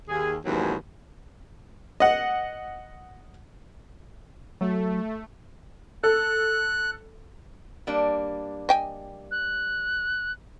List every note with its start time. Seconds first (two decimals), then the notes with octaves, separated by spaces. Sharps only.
0.08 D#2 G#4
0.45 D#2 G#2 B2 E3 F#3 C#4
2.00 D#5 F#5
4.61 F#3 A3
6.04 A4 F#6
7.87 G3 A#3 D4
8.69 D#5 G5 G#5
9.31 F#6